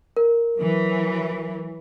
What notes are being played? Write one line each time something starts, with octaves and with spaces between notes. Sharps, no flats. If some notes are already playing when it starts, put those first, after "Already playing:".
A#4
E3 F#3